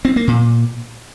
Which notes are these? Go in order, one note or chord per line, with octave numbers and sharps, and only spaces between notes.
C4
A#3
A#2